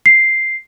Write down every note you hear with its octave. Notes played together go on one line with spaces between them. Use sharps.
C7